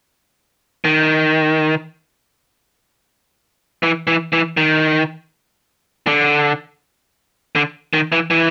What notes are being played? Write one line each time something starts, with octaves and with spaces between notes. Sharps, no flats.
D#3
E3
E3
E3
D#3
D3
D3
D#3
E3
E3